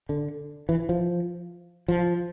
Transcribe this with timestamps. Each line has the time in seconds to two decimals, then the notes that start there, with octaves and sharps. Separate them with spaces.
0.09 D3
0.69 E3
0.89 F3
1.88 F3